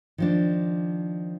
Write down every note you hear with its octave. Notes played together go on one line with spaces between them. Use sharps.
D#3 F3 D4